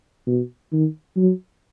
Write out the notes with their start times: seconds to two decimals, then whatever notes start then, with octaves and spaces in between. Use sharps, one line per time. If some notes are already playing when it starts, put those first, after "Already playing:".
0.27 B2
0.72 D#3
1.16 F#3